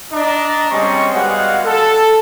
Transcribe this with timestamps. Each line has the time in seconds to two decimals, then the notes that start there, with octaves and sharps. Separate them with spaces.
0.13 D4 D#5 A#5
0.71 G3 G#3 C4 C#4 D#5 C#6
1.13 G3 G#3 B3 F#4 F5 F#5
1.65 A4